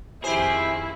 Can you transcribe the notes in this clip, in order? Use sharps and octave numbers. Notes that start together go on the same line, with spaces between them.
F2 D#3 E4 G4 G#4 C5